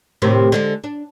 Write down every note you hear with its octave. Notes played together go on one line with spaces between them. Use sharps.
A2 C3 D#3
D3 G#3 D4
D4